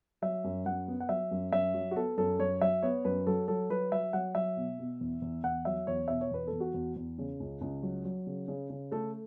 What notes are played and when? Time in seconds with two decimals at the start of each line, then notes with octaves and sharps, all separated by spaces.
0.22 F#3 E5
0.44 F#2
0.66 F#2 F#5
0.88 B3
1.00 F#5
1.09 F#3 E5
1.31 F#2
1.52 F#2 E5
1.74 F#3
1.91 F#4
1.96 B3 A4
2.17 F#2 A4
2.39 F#2 C#5
2.61 F#3 E5
2.83 B3 C#5
3.05 F#2 B4
3.27 F#3 A4
3.48 F#3 A4
3.70 F#3 B4
3.92 F#3 E5
4.13 F#3 F#5
4.35 F#3 E5
4.57 B2
4.79 B2
5.01 E2
5.22 E2
5.44 E2 F#5
5.65 F#3 E5
5.87 E2 C#5
6.08 B2 E5
6.21 C#5
6.31 E2 B4
6.47 A4
6.53 E2
6.60 F#4
6.74 E2
6.96 E2
7.18 C#3
7.40 C#2
7.61 C#2
7.83 F#3
8.05 F#3
8.27 C#3
8.48 C#3
8.70 C#3
8.92 A3 A4